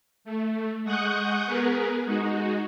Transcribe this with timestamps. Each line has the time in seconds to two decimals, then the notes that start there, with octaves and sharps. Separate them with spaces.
0.24 A3
0.84 G#3 F#5 C#6 D#6 F#6 G6
1.46 B3 G#4 A#4 B4
2.05 G#3 D#4 F#4